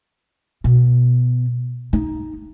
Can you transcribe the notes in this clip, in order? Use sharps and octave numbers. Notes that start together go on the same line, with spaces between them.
B2
D#4